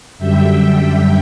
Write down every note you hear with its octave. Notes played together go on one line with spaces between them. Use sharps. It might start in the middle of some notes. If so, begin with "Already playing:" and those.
F#2 D3 G3 E5 G5